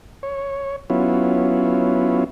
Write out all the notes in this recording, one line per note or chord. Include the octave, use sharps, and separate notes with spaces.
C#5
F#3 B3 C#4 E4 F4